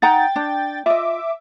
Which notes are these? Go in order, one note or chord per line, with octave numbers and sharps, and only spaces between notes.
D#4 F#5 G5 A#5 A6
D4
F4 D#5 E5 D6